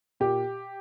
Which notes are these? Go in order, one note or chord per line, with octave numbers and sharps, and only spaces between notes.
A#2 G4